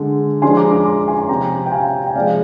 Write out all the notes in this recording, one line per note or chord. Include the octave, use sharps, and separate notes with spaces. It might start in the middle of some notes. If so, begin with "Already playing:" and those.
Already playing: D3 G#3
F3 G#3 D4 G#5 C6
A#5 D6
A#5 D6
C6
D6
G#5 C6
C6
C3 F3 C4 G5 A#5
G5
F5 G#5
G5
C3 F3 G#3 D5 F5